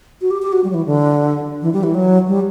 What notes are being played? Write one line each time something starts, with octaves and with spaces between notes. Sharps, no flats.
F#4
G4
G4
F#4
G3
F#3
E3
D3
E3
G3
E3
F#3
G3